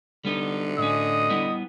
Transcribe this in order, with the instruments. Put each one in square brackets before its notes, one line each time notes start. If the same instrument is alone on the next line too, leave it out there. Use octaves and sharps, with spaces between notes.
[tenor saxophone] D3 [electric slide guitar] G3 B3 D#4
[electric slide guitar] A2 C#4 [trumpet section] D#5 D#6
[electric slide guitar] G3 B3 E4